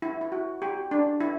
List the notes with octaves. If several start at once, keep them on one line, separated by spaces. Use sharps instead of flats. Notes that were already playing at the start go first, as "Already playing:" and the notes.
E4
E4
F#4
G4
D4
E4